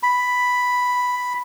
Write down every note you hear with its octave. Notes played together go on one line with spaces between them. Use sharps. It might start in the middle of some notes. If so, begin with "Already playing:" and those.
B5